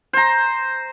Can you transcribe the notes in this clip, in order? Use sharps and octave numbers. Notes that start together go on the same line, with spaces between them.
C5 A#5